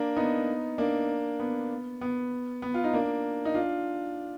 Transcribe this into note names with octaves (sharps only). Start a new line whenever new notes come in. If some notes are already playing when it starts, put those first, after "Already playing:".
Already playing: A#3 D4
B3 D#4
A#3 D4
B3
B3
B3
F4
D#4
A#3 D4
D#4
D4 F4